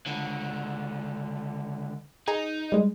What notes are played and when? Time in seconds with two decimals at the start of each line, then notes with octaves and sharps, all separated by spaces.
0.07 C#2 D3
2.28 D#4 G#4 G#5 A#5
2.72 G3 G#3